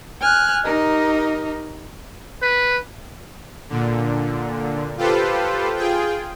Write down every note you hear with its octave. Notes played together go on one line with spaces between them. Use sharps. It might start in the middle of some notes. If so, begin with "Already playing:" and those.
G#5 F6 F#6
D#4 G4 A#4 D#5
B4
A#2 D3
F4 G4 A4 B4 C5
F4 G#4 G5